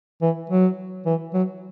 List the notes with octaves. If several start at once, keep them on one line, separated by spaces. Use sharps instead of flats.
E3
F#3
E3
F#3